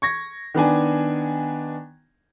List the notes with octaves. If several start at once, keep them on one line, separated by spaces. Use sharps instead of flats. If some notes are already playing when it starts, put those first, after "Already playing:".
C#6 G#6 A#6
D#3 B3 D4 G#5